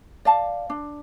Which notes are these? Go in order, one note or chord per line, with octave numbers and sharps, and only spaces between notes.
D5 F5 A5
D4